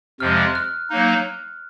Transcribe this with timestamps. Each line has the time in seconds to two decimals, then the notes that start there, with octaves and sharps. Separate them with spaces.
0.20 F2 C3 F3 G#3 F6
0.38 F#6
0.55 F#6
0.90 F#3 A#3 D#4